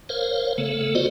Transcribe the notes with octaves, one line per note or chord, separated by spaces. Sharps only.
A#4 C5 C#5 F5
C#3 A3 B3 A4
F4 F#4 C5 D5 D#5